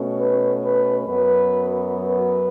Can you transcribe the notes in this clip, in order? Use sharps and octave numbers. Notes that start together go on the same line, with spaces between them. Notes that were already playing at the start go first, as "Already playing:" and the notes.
Already playing: B2 A3 C#4
B4
B4
F#2 F#3 B3 B4
B4